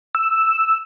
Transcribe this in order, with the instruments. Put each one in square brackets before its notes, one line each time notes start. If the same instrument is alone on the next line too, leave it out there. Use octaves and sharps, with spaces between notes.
[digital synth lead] E6